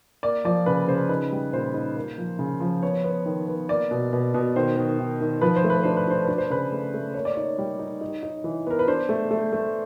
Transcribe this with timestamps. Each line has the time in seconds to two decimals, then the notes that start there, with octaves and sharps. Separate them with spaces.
0.23 A#3 D5
0.45 F3 D5
0.66 C#3 B4
0.88 C#3 C5
1.09 D#4 B4
1.32 G3
1.53 A#2 C5
1.74 D#4
1.96 A#3
2.18 F3
2.39 C#3
2.60 F3
2.83 B3 C#5
3.04 B3
3.26 D#3
3.48 B3
3.69 A#3 D5
3.91 B2
4.13 B2
4.34 B2
4.56 D#3 C5
4.77 D#3
4.99 D#3
5.21 D#3
5.41 F3 B4
5.56 C5
5.64 A3
5.70 B4
5.83 D4 C5
5.97 B4
6.07 D4 C5
6.24 D4 B4
6.38 C5
6.50 C#3 B4
6.72 A3
6.94 A3
7.14 A#3 C#5
7.25 D5
7.34 D#4 C#5
7.58 G3
7.79 D#4
8.01 D#4
8.23 D#4
8.44 E3
8.67 B3 A#4
8.79 B4
8.88 D4 C5
9.09 A3
9.31 A3
9.52 A3